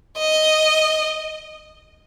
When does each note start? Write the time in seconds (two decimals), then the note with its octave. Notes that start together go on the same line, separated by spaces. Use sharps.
0.18 D#5